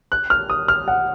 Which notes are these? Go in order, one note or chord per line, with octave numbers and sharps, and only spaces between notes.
F#6
F6
D#6
F6
F#5